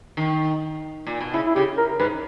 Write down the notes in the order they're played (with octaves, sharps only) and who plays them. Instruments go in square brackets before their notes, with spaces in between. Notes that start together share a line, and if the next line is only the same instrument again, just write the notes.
[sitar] D#3
A#2
B2
[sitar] C#3 [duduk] E4
[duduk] E4
[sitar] C#3 [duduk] G4
[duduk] A#4
[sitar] G#2 [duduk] B4